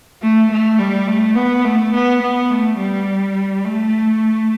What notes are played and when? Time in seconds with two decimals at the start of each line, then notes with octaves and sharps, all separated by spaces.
0.22 A3
0.51 A3
0.79 G3
1.07 A3
1.35 B3
1.65 A3
1.94 B3
2.22 B3
2.51 A3
2.78 G3
3.65 A3